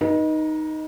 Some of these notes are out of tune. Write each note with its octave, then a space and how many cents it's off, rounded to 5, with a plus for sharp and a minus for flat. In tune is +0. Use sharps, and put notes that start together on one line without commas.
D#4 +0 B4 -40